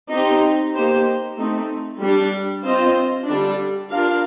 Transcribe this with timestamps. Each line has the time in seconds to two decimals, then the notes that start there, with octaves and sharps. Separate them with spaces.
0.11 C4 D#4 G4 C5
0.74 A#3 D#4 G4 C5
1.37 A3 C4 D#4
2.01 G3 D4 G4
2.64 C4 F4 C5 D#5
3.27 D3 G3 D4
3.90 D4 F4 A#4 F5